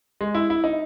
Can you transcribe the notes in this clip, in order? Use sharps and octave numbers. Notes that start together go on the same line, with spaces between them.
G#3
E4
E4
D#4